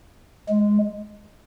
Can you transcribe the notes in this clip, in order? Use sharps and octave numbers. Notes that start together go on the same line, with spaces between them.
G#3